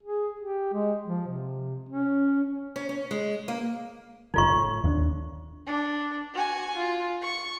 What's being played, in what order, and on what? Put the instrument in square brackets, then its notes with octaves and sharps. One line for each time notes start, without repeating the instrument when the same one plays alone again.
[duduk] G#4
G4
G#3
F3
C3
C#4
[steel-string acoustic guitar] C#4
C#4
G#3
A#3
[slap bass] F#1 D3 [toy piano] D#4 F4 C#6
[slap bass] A2
D#2 A#3 D4
[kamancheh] D4
F#4 G#5
F4
C#6